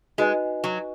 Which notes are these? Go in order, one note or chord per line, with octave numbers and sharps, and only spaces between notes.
G#3 D#4 F#4 B4 D#5 G#5
F#3